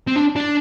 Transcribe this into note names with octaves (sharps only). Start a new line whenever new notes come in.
C4
D4
D4